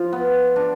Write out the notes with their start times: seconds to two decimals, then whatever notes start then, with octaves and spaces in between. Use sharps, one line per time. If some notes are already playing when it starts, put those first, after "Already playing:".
Already playing: F3 F4
0.13 B3
0.56 D4